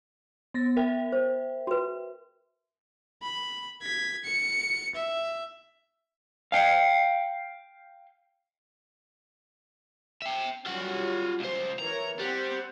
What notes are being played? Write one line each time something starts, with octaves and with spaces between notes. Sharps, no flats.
B3 A6 A#6
A#4 E5 G5
C5
F#4 B4
B5
G#6 B6
C#7
E5
F5 G5
E5 G5
F#3 G3 C#4 F4 F#5
C#2 C5
E3 A#4 C#5 A#5
G3 C4 C5 F#5